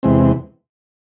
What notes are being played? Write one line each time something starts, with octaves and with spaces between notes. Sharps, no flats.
E2 C3 E3 G#3 C4